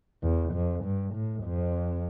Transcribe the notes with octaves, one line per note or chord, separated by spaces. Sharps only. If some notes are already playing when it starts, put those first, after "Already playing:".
E2
F2
G2
A2
F2